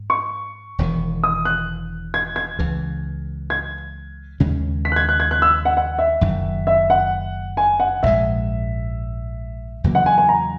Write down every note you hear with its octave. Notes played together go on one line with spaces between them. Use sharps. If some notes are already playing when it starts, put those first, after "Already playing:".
Already playing: G#2
C#6
E1 E2 D#3
D#6
F#6
G#6
G#6
C#2 C#3 E3
G#6
D#2 C#3 G#3 C#4
B6
F#6
G#6
F#6
G#6
F#6
E6
F#5
F#5
E5
F#1 F#2 D#3
E5
F#5
G#5
F#5
A#1 G#2 D#3 G#3 E5
E2 C#3 F#3 A#3
F#5
G#5
G#5
A#5